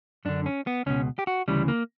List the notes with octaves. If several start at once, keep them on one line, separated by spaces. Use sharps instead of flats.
F#2 D3 D4
C#4
B3
C#2 B2 C#4
G4
F#4
D2 C#3 E3 G3
A#3